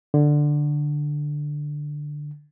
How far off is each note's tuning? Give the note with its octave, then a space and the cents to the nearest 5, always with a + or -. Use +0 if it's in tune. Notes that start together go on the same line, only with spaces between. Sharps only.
D3 +5